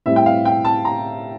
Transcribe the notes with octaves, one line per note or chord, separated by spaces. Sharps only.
A2 G3 C4 E4 E5
G5
F5
G5
A5
A#5